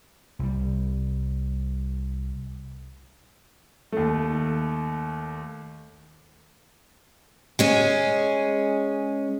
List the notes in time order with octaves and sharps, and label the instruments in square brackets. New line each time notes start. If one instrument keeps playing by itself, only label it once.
[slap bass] C2 G3
[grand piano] D#2 A3
[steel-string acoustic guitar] G#3 C#4 G#4